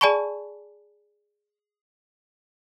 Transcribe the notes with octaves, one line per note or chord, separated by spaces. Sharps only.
G#4 D5 G#5 A5 B5 C#6